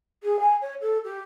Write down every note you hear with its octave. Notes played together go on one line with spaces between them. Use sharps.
G#4
G#5
C#5
A4
G4